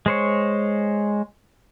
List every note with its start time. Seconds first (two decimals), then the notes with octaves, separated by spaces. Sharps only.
0.06 G#3 C5 C#5